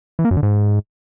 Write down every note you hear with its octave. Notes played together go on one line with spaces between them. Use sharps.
E3
A#3
F#2
D3
G#2